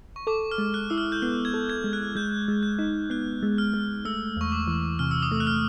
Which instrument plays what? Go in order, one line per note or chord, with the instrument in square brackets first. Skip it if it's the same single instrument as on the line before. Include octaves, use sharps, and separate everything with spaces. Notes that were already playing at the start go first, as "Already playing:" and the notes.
[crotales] C#6
[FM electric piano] A4 [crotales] D6
[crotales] F6
[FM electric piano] G#3
[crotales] F#6
[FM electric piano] E4 [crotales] E6
[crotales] F6
G6
[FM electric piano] B3 [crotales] F#6
[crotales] G#6
[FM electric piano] A4
[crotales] G#6
[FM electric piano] G#3
[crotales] F#6
[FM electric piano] G#3 [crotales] G6
[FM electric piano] G#3
[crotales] G6
[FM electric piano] D#4
[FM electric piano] B3 [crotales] F#6
[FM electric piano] G#3
[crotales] F6
[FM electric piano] G#3
[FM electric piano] A3 [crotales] E6
[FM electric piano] E2 [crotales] C#6
[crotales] D6
[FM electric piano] E3
[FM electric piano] C3 [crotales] F6
[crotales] E6
D#6
[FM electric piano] A3 [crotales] E6
[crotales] F#6
F6